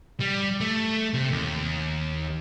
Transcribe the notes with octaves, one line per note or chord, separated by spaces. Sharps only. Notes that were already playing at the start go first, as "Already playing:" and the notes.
G3
A3
C3
D#2